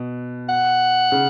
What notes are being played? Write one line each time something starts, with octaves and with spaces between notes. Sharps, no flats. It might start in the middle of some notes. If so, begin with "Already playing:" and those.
Already playing: B2
F#5
C#3